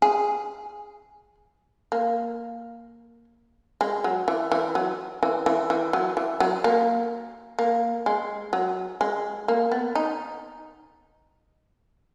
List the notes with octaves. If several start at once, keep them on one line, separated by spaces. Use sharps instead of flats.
G#4
A#3
G#3
F#3
E3
E3
F#3
E3
E3
E3
F#3
E3
F#3
A#3
A#3
G#3
F#3
G#3
A#3
B3
D#4